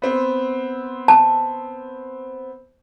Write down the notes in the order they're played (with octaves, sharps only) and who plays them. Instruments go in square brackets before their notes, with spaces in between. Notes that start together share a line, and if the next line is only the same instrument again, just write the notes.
[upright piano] B3 C4
[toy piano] A5